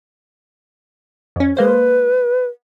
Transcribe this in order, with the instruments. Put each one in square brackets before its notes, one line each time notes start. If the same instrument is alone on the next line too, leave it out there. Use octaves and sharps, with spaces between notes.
[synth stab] F2 C#4
[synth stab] G#3 A#3 C5 [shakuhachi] B4